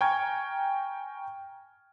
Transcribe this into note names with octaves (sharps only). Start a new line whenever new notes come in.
G5 G#5 A#5 C#6 F6 G#6